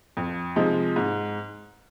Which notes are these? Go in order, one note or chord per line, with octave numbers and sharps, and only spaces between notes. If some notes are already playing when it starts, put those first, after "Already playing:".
F2
C3 F3 G#3 D#4
G#2